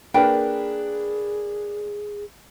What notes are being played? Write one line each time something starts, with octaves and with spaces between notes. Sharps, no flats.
A#3 D4 G#4 A#4 B4 G5